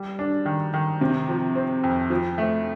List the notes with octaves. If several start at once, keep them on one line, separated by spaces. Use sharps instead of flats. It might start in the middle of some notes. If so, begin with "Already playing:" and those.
Already playing: G3
D4
D#3
D#3
C3
F3
C4
F2
F3
A3